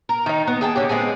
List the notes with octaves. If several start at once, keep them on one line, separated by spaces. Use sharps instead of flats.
A#4
D#3 D#4
B3
G#4 G5 A5
D3 C#4 G4
G#3 B3 C4 G#4